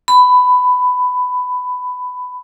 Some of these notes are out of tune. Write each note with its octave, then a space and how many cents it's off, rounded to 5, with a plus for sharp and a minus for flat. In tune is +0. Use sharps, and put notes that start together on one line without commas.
B5 +15